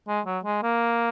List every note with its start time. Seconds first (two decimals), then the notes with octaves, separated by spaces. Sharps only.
0.08 G#3
0.26 F#3
0.45 G#3
0.63 A#3